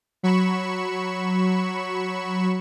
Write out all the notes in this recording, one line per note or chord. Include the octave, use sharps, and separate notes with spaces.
F#3 B5 C#6 C#7 E7